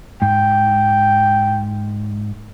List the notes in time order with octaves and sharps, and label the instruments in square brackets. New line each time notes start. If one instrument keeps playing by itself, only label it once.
[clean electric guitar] G#2 [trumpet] G5